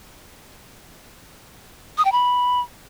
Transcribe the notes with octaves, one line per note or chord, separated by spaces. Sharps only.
D#6
G5
B5